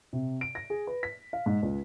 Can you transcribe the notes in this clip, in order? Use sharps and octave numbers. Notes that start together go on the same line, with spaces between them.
C3
D7
A#6
G#4
B4
B6
F5
G#2
C#2